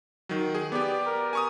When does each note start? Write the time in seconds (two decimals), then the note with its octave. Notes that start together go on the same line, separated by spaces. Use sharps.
0.29 D#3 F#3
0.55 G#4
0.72 B3 G4 D5
1.06 A#4
1.33 G#5 C#6 D#6